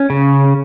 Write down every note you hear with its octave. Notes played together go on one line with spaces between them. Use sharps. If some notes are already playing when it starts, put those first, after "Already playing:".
Already playing: C#4
C#3